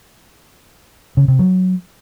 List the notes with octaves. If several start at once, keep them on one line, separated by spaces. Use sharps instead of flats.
C#3
C3
F#3